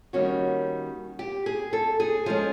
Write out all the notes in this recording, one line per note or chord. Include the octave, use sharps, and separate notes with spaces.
D#3 G3 A#3 C#4 F#4
G4
G#4
A4
G#4
F3 G#3 C#4 G#4